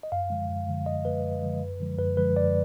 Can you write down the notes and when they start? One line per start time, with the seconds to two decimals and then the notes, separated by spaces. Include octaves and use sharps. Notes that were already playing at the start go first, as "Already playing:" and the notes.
0.03 D#5
0.12 F#2 F5
0.30 D3 F3 G#3
0.49 F#2
0.67 D3 F3 G#3
0.86 F#2 D#5
1.05 D3 F3 G#3 B4
1.24 F#2
1.42 D3 F3 G#3
1.62 F#2
1.80 D3 F3 G#3
1.99 F#2 B4
2.17 D3 F3 G#3 B4
2.36 F#2 D5